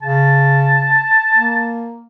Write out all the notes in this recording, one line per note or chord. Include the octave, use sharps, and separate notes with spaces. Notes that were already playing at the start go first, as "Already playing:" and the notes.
C#3 A5
A#3